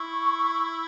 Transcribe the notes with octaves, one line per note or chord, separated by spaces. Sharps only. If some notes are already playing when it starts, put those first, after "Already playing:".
Already playing: E4 C#6